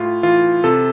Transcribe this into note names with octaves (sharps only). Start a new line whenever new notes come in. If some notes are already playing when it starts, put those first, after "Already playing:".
Already playing: A2 F4
E3 F4
C3 A4